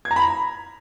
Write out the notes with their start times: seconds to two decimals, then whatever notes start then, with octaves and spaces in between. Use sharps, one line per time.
0.05 G#6
0.11 A#5
0.16 B5
0.22 A#5